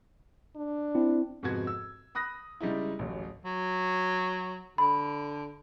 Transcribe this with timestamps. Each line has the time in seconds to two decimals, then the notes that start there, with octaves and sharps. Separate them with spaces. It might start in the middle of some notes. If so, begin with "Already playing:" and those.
0.56 D4
0.95 C4 E4
1.43 F2 G#2 C3 B3 F#4 G#6
1.67 E6
2.15 B5 D#6 F#6 A#6
2.61 C#3 G3 G#3 D#4 E4
2.99 D1 A1
3.45 F#3
4.78 D3 B5